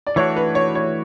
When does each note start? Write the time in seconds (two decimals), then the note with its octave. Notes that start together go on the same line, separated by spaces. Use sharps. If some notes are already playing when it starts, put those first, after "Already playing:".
0.07 D5
0.16 E3 A3 D4 F#4 C#5
0.36 B4
0.55 C#5
0.75 C#5